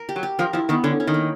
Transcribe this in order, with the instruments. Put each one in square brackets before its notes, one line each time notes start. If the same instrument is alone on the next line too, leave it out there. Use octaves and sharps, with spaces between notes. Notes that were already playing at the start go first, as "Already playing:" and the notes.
Already playing: [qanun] A#4
G4
[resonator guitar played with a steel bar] F#3
[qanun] G4
[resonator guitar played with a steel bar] F3 [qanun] A#4
[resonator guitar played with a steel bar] F3 [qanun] E4
[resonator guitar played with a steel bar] D#3 [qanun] B3
[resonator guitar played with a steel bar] D3 [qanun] C#4
[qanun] C#4
[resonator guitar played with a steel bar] D#3
[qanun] A#3